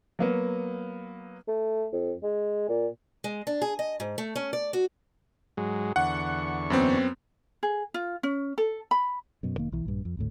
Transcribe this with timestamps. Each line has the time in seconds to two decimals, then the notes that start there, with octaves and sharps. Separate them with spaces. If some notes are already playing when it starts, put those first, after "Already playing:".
0.19 F#3 A#3 B3
1.48 A3
1.93 F2
2.23 G#3
2.69 A#2
3.24 G#3
3.47 D4
3.62 G#4
3.79 D#5
4.00 G#2
4.18 A3
4.36 C#4
4.53 D5
4.73 F#4
5.57 G#2 F#3 G#3
5.96 E2 D3 F#5 C#6
6.70 F#2 B3 C4
7.63 G#4
7.94 F4
8.23 C#4
8.58 A4
8.91 B5
9.43 F#2 B2
9.56 F1 D#3 A#3
9.72 B1 E3
9.85 A#1 G2
10.05 F2
10.17 G#1 D2 A2